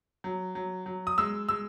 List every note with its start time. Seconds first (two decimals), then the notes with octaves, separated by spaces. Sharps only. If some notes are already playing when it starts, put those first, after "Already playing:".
0.24 F#3
0.55 F#3
0.86 F#3
1.07 D#6
1.18 G#3 E6
1.49 G#3 E6